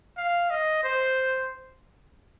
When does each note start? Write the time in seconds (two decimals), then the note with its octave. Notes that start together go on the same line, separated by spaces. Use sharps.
0.17 F5
0.51 D#5
0.84 C5